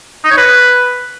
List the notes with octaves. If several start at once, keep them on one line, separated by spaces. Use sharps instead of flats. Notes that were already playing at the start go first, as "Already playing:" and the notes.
D#4
C#5
B4